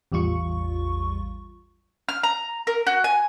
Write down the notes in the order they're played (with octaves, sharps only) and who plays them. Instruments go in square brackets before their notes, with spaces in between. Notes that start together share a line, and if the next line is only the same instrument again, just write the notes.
[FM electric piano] A1 E2 G3 F4 C#6
[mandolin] F6
A#5
A#4
F#4
G#5